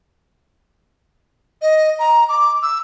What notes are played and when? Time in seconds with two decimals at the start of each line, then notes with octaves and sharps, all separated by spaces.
1.62 D#5
1.99 A#5
2.29 D6
2.63 E6